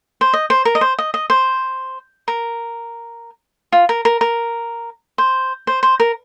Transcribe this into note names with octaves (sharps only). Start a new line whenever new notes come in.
C5
D#5
C5
A#4
D#5
C5
D#5
D#5
C5
A#4
F4
A#4
A#4
A#4
C5
C5
C5
A#4